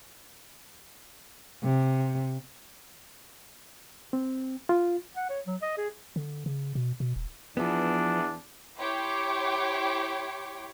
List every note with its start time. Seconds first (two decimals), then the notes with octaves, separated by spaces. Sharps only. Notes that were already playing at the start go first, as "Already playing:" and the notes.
1.64 C3
4.13 C4
4.69 F4
5.16 F#5
5.30 C#5
5.47 F#3
5.62 D#5
5.78 G#4
6.16 D3
6.46 C#3
6.75 B2
7.00 B2
7.16 D#1
7.57 E2 F3 B3 D4
8.78 E4 G4 C#5 G5 C6 D6